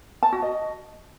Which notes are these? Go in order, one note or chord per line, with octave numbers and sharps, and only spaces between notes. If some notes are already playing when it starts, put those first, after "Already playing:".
A5
F#4
D#5